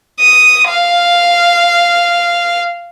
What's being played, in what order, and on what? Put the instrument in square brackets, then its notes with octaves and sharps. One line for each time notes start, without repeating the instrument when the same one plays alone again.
[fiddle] D#6
F5